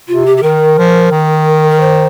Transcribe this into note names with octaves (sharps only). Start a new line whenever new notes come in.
C3 F4
G4
G4
D#3 A#4
F3
D#3
A#4
C5